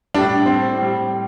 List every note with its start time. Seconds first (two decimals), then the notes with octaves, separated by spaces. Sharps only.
0.14 A2 G3 D4
0.46 C4
0.78 A2 G3